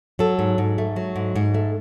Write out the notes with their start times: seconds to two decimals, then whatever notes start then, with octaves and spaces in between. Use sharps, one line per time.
0.19 F#3 A4
0.39 G#2
0.58 G#2
0.78 A3
0.96 F#3
1.16 G#2
1.36 G#2
1.54 A3